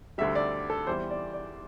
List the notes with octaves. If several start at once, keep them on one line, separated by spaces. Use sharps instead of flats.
D2 D3 G3 E5
D5
A4
E2 E3 G3 C5
D5
D5